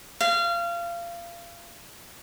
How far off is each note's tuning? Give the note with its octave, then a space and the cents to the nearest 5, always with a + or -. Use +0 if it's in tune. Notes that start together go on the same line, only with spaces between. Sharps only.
F5 -25